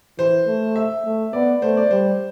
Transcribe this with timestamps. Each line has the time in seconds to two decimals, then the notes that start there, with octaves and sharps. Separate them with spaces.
0.19 E3 C5
0.47 A3
0.76 E5
1.05 A3
1.33 B3 D5
1.62 A3 C5
1.77 D5
1.91 G3 C5